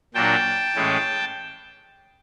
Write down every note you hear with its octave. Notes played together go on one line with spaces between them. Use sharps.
A#2 F#3 A#3 D4 G5 A5
A2 E3 G#3 C#4